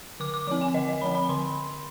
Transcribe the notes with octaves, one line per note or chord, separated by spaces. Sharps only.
D3 D6
D6
F3 C4 D6
G#5
D3 D#5
D#5
F3 C4 B5
B5
D3 C6